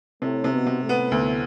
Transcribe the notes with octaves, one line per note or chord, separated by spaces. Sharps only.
A2 C3 A3
C3
B2 B3
C3
A2 A3
B3
D2